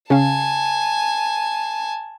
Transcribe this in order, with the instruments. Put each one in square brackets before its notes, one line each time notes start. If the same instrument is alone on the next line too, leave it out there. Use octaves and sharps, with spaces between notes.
[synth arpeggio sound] C#3 C#4 F5 [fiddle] G#5 A5